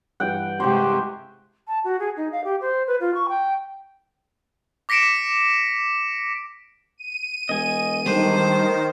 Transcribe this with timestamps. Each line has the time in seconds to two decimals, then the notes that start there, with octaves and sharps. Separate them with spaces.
0.20 G2 E3 F#5 G5
0.60 C3 G#3 G4 C5 C#6
1.68 A5
1.84 F#4
2.00 G#4
2.17 D#4
2.32 F5
2.44 G4
2.61 C5
2.87 B4
3.00 F4
3.14 C#6
3.29 G5
4.89 D6 A#6 B6 C#7 D7 E7
6.98 D#7
7.49 E1 D#5 G#5
8.06 D#3 G3 A3 D4 C5